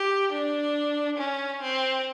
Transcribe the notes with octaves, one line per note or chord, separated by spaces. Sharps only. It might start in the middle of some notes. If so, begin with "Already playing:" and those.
Already playing: G4
D4
C#4
C4